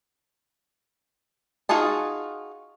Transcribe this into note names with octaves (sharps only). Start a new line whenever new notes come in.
D#4 F4 F#4 G#4 A5